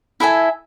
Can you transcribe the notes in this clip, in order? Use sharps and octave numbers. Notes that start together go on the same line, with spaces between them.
E4 A4 E5 G#5